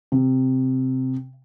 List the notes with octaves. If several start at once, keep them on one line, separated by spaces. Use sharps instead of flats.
C3